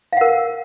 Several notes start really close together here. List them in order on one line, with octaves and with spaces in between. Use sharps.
F5 F#5 A#4